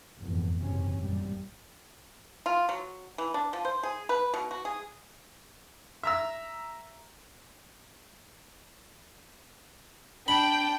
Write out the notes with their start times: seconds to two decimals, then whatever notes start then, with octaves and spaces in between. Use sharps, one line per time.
0.20 F1 E2 G#2
0.61 F#1 E2 G#2 C3 C#4
1.00 G#1 F#2 A#2 G3
2.46 F4
2.69 F#3
3.18 E3
3.34 D4
3.53 F3
3.65 C5
3.83 G#4
4.09 B4
4.34 B2
4.51 F#4
4.65 G#4
6.03 E5 A#5 E6
10.28 D4 G5 B5